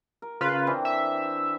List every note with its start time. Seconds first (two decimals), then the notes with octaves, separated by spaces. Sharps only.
0.22 A#4
0.41 C#3 F4 B4
0.67 E3 C4 D4
0.85 E5